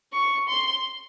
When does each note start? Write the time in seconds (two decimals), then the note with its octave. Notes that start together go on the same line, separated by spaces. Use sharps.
0.13 C#6
0.48 C6